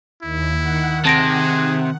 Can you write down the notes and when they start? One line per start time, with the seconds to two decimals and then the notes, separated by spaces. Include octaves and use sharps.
0.23 D#2 E4
0.56 D#3 F#5
1.05 C3 G#4 A5 A#6 D7